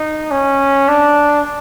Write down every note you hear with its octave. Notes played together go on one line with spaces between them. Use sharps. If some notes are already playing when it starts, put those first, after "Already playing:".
Already playing: D#4
C#4
D4